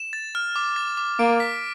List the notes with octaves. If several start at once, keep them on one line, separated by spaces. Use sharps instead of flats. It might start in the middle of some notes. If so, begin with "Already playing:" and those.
Already playing: E7
A6
F6
D6
A6
D6
A#3 D7
B6